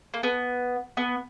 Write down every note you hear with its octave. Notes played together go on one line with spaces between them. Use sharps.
A#3
B3
B3